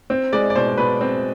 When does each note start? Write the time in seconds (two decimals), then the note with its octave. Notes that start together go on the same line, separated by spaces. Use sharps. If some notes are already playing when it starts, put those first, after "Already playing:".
0.10 C4
0.33 G#3 D5
0.50 D5
0.55 B2 C5
0.78 B2 B4
1.01 C4